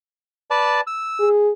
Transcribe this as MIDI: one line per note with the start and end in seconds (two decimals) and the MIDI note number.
0.51 0.81 71
0.51 0.81 74
0.51 0.81 81
0.87 1.29 88
1.20 1.52 68